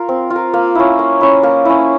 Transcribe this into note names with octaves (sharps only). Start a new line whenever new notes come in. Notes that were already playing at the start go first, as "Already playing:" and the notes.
Already playing: F4 A#4
C4
F4
A#4
A#3
C#4 E4
A#3
C#4 E4
A#3
C#4 E4